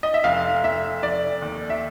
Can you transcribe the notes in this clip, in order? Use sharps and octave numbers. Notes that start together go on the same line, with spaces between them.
D#5
E5
F1 F5
F1 E5
F1 D5
D#2
E5